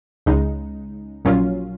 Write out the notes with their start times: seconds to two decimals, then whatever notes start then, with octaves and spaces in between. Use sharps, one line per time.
0.26 C#2 C#3 G#3 D#4
1.25 A#1 A#2 F#3 C#4 F4